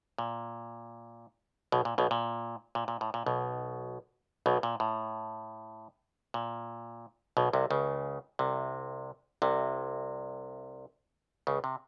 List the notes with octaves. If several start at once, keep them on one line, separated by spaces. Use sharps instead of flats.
A#2
B1 B2
A#2
B1 B2
A#2
A#2
A#2
A2
A#2
B1 B2
B1 B2
A#2
A2
A#2
B1 B2
C2 C3
C#2 C#3
C2 C3
C2 C3
C#2 C#3
C3